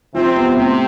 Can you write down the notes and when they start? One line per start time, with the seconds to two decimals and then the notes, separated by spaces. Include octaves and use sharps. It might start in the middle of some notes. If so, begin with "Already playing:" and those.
0.14 C3 F3 C4
0.36 B3
0.57 A2 C3 C4